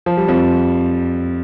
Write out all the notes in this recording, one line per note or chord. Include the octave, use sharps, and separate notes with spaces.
F3
G3
F2 F3